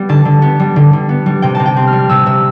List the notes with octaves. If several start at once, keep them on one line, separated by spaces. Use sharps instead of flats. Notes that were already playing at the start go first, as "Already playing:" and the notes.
Already playing: G3 B3
D3 A5
D3
B3
G3
D3
D3
B3
G3
C3 G5
C3 A5
G5
C4
F6
G3
C3 E6
C3 E6